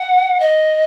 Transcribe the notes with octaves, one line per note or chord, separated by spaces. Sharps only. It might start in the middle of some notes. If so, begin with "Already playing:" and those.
Already playing: F#5
D#5